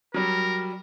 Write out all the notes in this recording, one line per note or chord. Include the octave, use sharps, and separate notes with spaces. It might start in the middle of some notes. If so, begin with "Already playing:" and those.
F#3 G3 A#4